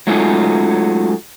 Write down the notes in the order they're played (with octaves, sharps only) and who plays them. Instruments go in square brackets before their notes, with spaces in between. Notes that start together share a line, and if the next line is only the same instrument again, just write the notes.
[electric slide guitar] F#3 G#3 A3 C#4 D#4 F4